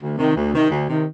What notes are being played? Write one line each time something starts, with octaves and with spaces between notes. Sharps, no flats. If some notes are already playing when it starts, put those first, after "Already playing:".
D2
C3 D#3
D2
C3 D#3
D2
C3 D#3